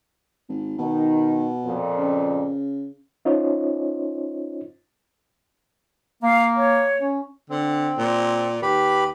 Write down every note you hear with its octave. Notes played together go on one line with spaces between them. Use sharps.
G#1
B2 D#3
F2 A#2
C#3
C#4 D#4 F4 C5 C#5 D#5
A#3 F5
C#5
C#4
D3 C4
A#2
D#2 G4 B4 B5